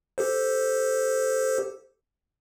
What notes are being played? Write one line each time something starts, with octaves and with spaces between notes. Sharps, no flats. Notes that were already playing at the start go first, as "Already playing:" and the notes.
G4 A4 C5